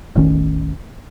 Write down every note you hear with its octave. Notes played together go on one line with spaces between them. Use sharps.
E1 A1 D#3 C#4